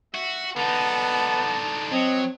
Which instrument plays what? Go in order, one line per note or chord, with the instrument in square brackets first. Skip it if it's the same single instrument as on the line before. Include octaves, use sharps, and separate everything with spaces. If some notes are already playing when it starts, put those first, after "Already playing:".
[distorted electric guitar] F#4 [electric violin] E5
[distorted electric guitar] D3 D#4 [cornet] B3 [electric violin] A5
[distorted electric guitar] F#3 [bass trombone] C4 [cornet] D#5